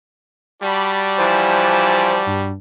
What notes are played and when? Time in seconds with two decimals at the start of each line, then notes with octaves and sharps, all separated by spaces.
0.62 G3 F#4 D5 A5 B5
1.17 E3 F3 C5
2.27 G2